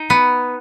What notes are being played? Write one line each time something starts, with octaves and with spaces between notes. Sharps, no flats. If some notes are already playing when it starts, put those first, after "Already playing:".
Already playing: D#4
B3